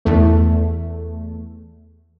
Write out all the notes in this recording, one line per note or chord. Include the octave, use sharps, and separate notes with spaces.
E2 A3